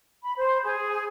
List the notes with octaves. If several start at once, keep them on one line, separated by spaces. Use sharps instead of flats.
B5
C5
G#4